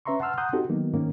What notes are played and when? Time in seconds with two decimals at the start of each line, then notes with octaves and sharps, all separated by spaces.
0.05 C#4 B4 E5 A#5 C6 C#6
0.20 F#5 A5 C6 E6 F6
0.38 F#5 A#5 C6 D#6 F#6 G6
0.53 C4 D#4 F#4 G4 A4
0.69 D#3 F#3 A#3 B3 D#4
0.93 G#2 D#3 A#3 C#4